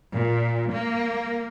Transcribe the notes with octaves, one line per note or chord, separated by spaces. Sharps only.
A#2
A#3